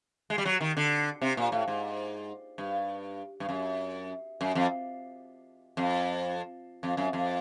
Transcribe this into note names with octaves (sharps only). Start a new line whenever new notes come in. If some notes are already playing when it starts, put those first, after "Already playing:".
G#3
G3
F#3
D#3
D3
C3
A#2
A2
G#2
G2
G2
F#2
F#2
F2
F2
F2
F#2
F2